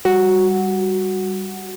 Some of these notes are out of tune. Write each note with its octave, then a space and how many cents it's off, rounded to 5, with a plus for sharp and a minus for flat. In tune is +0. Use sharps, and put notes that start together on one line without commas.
G3 +0 F#4 +0